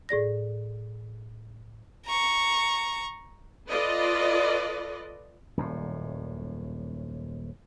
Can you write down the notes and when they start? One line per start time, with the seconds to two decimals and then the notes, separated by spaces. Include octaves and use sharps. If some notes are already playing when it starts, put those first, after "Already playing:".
0.09 A2 G#4 D5 A#6
2.06 A#5 C#6
3.69 F4 A4 B4 D5 D#5
5.57 D#1 F#2 A2